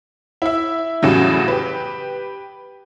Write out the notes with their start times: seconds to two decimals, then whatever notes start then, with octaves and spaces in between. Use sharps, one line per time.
0.42 E4 E5
1.02 E2 A2 C#3 F#3 G3
1.48 G4 B4